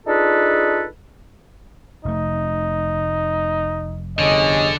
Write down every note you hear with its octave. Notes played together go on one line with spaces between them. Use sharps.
D4 D#4 F4 G#4 A4 B4
F1 A3 D#4
G1 D3 C#4 G#4 D#5